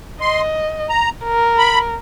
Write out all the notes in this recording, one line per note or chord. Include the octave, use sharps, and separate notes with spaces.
D#5 C6
A#5
A#4
B5